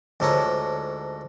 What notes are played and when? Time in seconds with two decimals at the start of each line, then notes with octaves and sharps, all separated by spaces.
0.20 D2 G#2 F4 A4 A#4 C#5